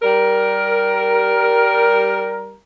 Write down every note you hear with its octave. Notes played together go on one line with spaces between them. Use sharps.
G3 A#4